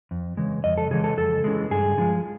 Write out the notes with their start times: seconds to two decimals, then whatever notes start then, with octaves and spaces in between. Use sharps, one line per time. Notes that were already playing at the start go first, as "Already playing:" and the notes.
0.11 F2
0.37 C#3 E3 G#3
0.64 F2 D#5
0.77 A4
0.91 C#3 E3 G#3 G#4
1.04 A4
1.17 F2 A4
1.44 C#3 E3 G#3
1.71 G2 G#4
1.98 D3 F3 G#3